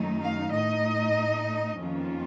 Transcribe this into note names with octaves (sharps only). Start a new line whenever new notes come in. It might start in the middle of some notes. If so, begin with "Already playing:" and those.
Already playing: F#2 D#3 A3 D#4
F5
A2 A3 D#4 D#5
F2 D#3 A#3 C#4 F4